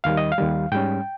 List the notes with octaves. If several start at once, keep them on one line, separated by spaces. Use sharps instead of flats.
D#2 D#3 G3 F5
D#5
F5
D#2 D#3 G3
G#2 G3 C#4 G5